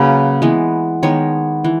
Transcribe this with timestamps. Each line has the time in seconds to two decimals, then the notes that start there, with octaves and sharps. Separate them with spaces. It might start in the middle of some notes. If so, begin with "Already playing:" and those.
Already playing: C#3 F#3 A#3 B4
0.42 E3 G#3 B3
1.03 D#3 G#3 B3 C#5
1.64 E3